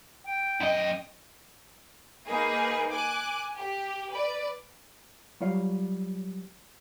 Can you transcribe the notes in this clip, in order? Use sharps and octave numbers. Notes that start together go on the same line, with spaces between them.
G5
F#2 D#5
A#3 D#4 G#4 B4
G#5 D6 F#6
G4
B4 D5
F#3 G3 F4 C#5 F5